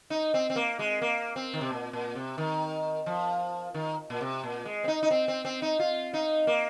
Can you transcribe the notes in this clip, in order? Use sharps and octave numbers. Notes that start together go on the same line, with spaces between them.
D#4
C4
C4
A#3
G#3
A#3
C4
D#3
C3
A#2
A#2
C3
D#3
F3
D#3
A#2
C3
A#2
G#3
C4
D#4
D#4
C4
C4
C4
D#4
F4
D#4
A#3